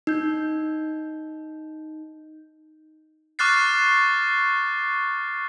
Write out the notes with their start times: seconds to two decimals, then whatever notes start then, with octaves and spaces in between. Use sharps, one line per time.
0.07 D#4 G6
3.39 C#6 D6 F6 F#6 A6 C7